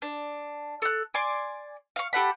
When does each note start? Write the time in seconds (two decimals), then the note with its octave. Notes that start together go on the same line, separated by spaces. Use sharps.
0.02 D4
0.82 A4 F#6
1.14 D5 G#5 C6 D6
1.96 F5 C#6
2.13 G4 A4 F#5 B5